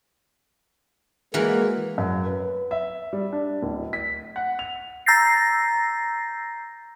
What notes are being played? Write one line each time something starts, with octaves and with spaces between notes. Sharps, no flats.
E3 G#3 A#3 F#4 A#4
F#2
B4
E5
G3
D4
D1
B6
F#5
F7
A#5 E6 G6 A6 A#6 C7